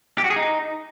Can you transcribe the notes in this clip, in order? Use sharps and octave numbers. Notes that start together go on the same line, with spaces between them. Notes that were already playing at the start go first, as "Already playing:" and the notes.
G4
F#4
G#4
D#4